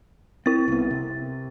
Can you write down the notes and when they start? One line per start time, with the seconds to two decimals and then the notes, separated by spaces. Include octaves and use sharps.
0.46 C4 E4 A6
0.68 C2 B3
0.91 C3